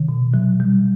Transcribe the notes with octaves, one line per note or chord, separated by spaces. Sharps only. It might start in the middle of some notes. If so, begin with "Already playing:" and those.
Already playing: C3 D#3
B2
F#3
G3